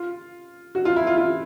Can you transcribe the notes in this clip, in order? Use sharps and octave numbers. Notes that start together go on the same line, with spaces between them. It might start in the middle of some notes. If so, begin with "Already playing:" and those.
Already playing: F4
F#4
F4
E4
F4
F4